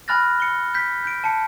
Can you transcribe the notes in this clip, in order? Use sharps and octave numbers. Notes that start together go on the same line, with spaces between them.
G#5 B5 F6 F#6 A6 A#6
C#7 G7
G6 B6
G6 D7
A5 C#7